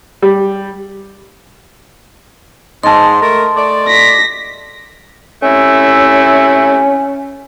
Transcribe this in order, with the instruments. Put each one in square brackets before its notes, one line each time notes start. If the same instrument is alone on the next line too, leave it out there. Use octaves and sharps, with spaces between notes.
[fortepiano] G3
[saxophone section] G#2 [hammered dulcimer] D#5 A5 [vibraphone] C6
[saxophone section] A3 A#4
A3 D5
[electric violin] A#6 B6
[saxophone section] C3 A3 E4 [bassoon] C#4